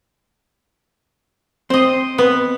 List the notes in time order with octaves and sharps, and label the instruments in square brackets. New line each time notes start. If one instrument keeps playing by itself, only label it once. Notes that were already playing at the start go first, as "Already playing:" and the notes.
[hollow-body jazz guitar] C4 [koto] C5 D#5
[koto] B3